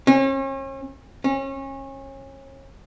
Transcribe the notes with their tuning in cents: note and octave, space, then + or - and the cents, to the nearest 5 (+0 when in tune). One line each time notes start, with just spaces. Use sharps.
C#4 -40
C#4 -30